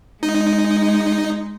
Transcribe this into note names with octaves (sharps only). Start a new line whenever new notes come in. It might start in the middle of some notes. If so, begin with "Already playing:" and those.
G#3 D#4